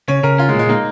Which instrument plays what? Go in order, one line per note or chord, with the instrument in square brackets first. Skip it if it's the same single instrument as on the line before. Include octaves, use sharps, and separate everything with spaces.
[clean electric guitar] C#3 [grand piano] C#5
[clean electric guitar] C#3 [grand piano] A#4
[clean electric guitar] C#4 [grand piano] F4
[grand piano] G#3
[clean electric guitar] A#2
[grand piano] G#3
[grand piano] A#3 [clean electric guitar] D#4